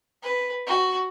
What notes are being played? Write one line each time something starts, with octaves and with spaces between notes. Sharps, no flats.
B4
F#4